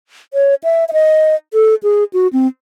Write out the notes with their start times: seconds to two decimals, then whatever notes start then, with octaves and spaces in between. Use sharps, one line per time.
0.34 C#5
0.64 E5
0.89 E5
0.93 D#5
1.54 A4
1.83 G#4
2.13 F#4
2.33 C4